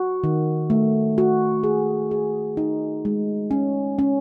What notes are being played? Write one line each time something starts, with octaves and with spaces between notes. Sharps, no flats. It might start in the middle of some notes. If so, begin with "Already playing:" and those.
Already playing: F#4
D#3
A3
F#4
G#4
G#4
D#4
G#3
C#4
C#4